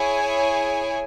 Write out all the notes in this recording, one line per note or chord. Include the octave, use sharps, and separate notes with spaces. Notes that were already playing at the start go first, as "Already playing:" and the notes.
Already playing: E4 G#4 C#5 G#5